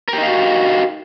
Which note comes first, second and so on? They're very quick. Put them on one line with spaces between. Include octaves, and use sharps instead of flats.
A#4 G4 D#4 F5 F#4